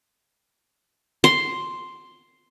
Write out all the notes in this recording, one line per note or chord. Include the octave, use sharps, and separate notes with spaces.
C6